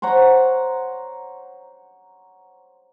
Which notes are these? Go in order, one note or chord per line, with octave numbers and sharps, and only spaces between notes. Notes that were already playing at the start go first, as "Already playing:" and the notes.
C5 C#5 F#5 A#5